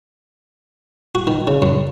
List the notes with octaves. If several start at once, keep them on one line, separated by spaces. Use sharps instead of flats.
F#4
D#3
C#3
F#2